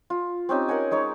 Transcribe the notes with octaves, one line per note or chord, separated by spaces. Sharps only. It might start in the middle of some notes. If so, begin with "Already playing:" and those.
F4
C4 C#4 D#4 G4
A#4 D#5 F#5 G#5
G#3 D#4 C#5 D6